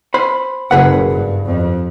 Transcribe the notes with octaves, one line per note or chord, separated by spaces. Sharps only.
C5 B5
F#1 G#4 B4 F#5
G2
F2